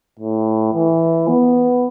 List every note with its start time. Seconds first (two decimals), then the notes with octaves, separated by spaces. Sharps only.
0.19 A2
0.74 E3
1.29 B3